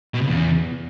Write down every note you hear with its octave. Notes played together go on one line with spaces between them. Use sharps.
B2
C#3
E2